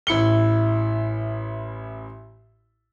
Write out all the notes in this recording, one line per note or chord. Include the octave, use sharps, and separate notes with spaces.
A1 E4 C#7 G7